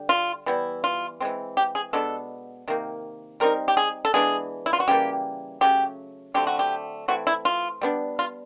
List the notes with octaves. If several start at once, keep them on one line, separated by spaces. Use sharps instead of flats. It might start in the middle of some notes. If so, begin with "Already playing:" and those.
Already playing: D3 G3
F4
E3 G3 B3 E4
F4
E3 G#3 C4
G4
G#4
B2 G#3 B3 D4 A4
C3 D#3 A#3
G3 C4 D#4 A#4
G4
G#4
A4
E3 G#3 B3 D4 G#4
E4
F4
F#4
C#3 E3 G3 A#3 G4
C#3 F#3 A3 C#4 G4
D3 F#3 A3 C4 G4
F#4
G4
E3 A3 C4 E4 F#4
E4
F4
G3 B3 D4
F4